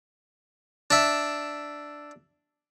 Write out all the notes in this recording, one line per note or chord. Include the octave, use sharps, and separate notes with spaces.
D4 E5